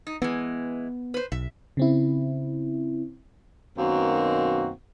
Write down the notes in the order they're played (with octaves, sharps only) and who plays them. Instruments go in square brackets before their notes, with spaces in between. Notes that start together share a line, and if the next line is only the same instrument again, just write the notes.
[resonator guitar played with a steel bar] D#4
[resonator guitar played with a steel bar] E3 G#3 [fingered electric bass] B3
[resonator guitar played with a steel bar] B4 C5
[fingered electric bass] B1 [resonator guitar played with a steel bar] E5
[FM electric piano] C#3 C4 E4
[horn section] F#2 B2 D#3 A#3 C4 F#4